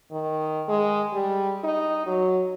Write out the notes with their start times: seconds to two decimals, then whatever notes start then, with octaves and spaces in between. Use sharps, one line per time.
0.11 D#3
0.68 G#3
1.13 G3
1.64 D#4
2.06 F#3